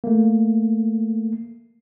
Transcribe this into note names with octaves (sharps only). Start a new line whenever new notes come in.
A3 A#3